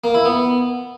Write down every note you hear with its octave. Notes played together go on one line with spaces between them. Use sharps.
A#3
E4
B3